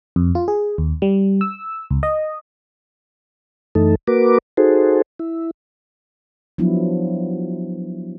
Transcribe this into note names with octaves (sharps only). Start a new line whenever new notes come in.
F2
F4
G#4
D#2
G3
E6
C#2
D#5
F#2 E3 A3 D#4 A4
A#3 F#4 A#4 B4 D6
D#4 F#4 G#4 A4 C5
E4
F3 F#3 B3 D4 E4